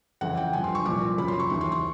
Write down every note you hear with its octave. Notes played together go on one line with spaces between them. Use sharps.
F2 C#3 E3 F#5
G5
G2 D3 F3 G#5
C6
C#6
C2 A#2 F3 D6
F#2 C#3 F3 B5
C6
C#6
D#2 C#3 E3 C#6
C6
C#6